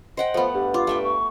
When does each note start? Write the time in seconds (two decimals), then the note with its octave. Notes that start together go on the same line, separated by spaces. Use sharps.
0.17 C5 D#5 F#5 G5
0.34 F3 A3 B3
0.54 G2 G4
0.74 F4 D6
0.87 A3 E5 G5
1.04 C#6